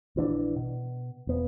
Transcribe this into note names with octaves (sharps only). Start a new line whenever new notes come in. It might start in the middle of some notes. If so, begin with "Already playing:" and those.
A#1 E3 C#4 D4
B2
E1 B3